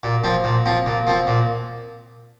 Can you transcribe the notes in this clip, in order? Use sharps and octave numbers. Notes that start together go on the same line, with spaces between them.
A#2
F3 C4
A#2
F3 C4
A#2
F3 C4
A#2